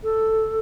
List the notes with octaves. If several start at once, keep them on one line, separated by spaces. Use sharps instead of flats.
A4